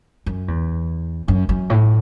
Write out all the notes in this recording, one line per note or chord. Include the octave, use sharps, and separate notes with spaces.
F#2
E2
F#2
F#2
A2